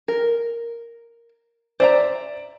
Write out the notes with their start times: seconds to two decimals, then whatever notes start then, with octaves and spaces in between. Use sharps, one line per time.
0.08 A#4
1.80 C5 D5 E5 A#5